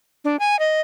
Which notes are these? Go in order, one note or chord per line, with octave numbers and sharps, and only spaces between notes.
D4
G#5
D#5